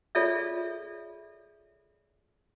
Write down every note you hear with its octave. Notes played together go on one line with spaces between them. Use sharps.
F4 G#4 A4 C#5 D5 E5